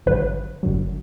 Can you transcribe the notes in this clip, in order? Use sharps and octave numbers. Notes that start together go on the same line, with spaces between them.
G#1 G2 D3 F#3 B4
G1 F#2 D3 F#3